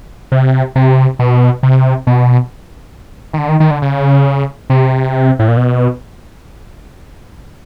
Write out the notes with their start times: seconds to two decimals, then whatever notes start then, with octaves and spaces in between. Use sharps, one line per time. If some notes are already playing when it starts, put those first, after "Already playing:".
0.32 C3
0.76 C3
1.19 B2
1.63 C3
2.07 B2
3.33 D#3
3.38 D3
3.49 D#3
3.60 D#3
3.71 D3
3.82 C#3
4.70 C3
5.39 A2
5.48 A#2
5.57 B2